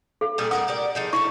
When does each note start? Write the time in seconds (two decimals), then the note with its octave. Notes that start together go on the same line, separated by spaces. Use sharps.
0.21 A4
0.38 A#2 G3 G#4
0.51 A2 A#4 F#5 D#6
0.68 G4 A#4 D5
0.95 F3 D#4 G#4
1.13 A3 C#4 E4 G#4 C#6